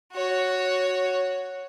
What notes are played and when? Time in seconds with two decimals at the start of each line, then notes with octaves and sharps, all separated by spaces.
0.13 F#4 C#5